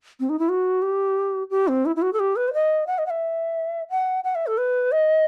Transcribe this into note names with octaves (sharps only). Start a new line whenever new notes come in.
C4
D#4
E4
F#4
G4
G4
C4
E4
E4
F#4
A4
G4
B4
C5
D#5
F#5
D#5
F#5
E5
F#5
F#5
E5
A4
B4
D#5